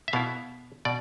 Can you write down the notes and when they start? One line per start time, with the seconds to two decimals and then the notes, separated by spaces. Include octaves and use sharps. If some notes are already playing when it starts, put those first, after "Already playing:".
0.08 E5
0.13 B2 B3 E4 F5
0.85 B2 D5